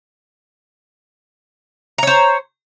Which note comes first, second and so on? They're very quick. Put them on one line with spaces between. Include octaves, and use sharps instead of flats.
A#5 C#5 C5